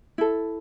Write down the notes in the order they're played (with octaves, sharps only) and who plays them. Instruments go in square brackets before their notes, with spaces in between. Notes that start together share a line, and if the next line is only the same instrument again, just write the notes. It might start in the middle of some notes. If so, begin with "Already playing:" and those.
[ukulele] E4 A4